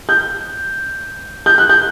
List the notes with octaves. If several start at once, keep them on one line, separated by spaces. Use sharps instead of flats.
G6
G6
F#6
G6